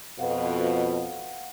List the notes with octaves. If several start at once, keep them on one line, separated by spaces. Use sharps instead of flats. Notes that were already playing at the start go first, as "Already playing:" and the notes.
F2 B2 F5 F#5